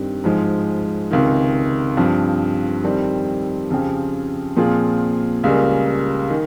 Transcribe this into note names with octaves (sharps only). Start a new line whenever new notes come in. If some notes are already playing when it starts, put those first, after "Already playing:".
Already playing: G2 D#3 G3 C4
G#2 F3 G#3
C#2 C3 D#3
G2 F3 C4
F2 D#3 G3 C4
F2 C#3 F3 C4 G4
A#2 F3 C4 F4 G#4
C#2 C#3 G3 A#3
D#3